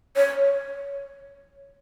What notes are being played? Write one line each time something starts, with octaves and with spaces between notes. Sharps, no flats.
C#5